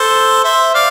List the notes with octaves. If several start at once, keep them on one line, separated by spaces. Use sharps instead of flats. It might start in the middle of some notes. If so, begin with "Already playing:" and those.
Already playing: A4 C5
C5 E5
D5 F5